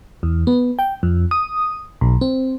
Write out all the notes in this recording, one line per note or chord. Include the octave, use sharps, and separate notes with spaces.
E2
B3
G5
F2
D#6
B1
C4